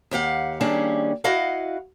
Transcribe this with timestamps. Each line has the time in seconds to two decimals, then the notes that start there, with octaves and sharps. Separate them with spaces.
0.11 D#2 G4 F5 F#5
0.61 D#3 G3 A#3 C#4 D4 G#4
1.24 E4 F#4 D#5 F5 F#5